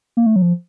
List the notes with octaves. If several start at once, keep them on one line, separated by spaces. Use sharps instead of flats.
A#3
A3
F#3
F3